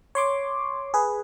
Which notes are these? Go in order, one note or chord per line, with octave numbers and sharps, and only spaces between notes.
C#5 C6 D6
G#4 B4